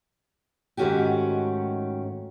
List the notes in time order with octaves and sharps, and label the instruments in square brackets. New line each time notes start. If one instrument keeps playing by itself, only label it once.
[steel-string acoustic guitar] G#2 D#3 A3 C#4 F#4 G4